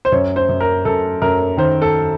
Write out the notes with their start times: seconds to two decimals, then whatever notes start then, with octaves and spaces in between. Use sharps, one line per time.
0.05 C5
0.12 F#2 C#5
0.36 C5
0.49 F#2
0.60 A#4
0.85 F#2 A4
1.22 F#2 A#4
1.57 D#3 C5
1.82 A4